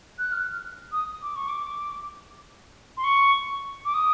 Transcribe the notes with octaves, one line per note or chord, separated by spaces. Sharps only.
F#6
F6
D#6
D6
C#6
D6
C6
C#6
D6
D#6